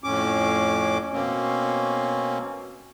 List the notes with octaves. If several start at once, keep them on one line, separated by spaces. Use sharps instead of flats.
F2 A2 C#4 D6
B2 A#3 C4 C#4